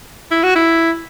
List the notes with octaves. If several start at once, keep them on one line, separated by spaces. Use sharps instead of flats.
E4
F#4
E4